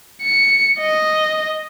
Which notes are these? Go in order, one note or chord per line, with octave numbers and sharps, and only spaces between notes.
C#7
D#5